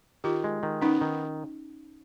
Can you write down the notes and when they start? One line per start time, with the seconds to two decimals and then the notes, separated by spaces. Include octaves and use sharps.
0.24 D#3 F4 G4
0.44 G#3
0.63 D#3
0.81 B3 C#4 D#4
1.01 D#3